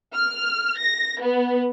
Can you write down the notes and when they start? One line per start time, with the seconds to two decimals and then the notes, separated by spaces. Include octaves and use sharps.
0.14 F6
0.78 A#6
1.21 B3